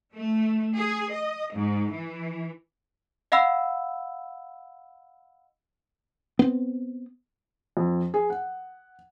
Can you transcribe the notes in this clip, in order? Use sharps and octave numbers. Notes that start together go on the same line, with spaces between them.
A3
G#4
D#5
G#2
E3
D#5 F5 F#5 B5 E6
B3 C4
F2
G#4
F#5